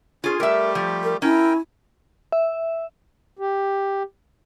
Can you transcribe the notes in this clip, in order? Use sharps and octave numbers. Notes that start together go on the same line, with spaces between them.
C#4 F4 G#4
G3 A3 G4 A#4 E5
F3
A#4
C#4 E4 A#4 G5
E5
G4